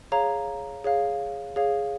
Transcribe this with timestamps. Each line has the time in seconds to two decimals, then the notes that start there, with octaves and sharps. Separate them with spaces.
0.12 G#4 C#5 F5 A#5
0.84 G#4 C#5 F5
1.56 G#4 C#5 F5